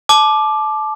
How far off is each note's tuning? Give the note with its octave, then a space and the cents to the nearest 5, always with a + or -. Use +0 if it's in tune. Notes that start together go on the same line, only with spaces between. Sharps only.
A5 -25 D6 +10